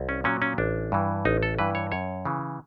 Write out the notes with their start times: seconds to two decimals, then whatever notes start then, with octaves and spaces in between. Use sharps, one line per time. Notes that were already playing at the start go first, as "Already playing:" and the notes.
Already playing: C2
0.09 C#4
0.24 A#2 F#3 C#4
0.42 C#4
0.58 A1 D4
0.92 G2 E3
1.25 A1 D#4
1.43 A4
1.59 G2 E3 B4
1.75 C#5
1.92 F#2 C#5
2.25 C#3 E3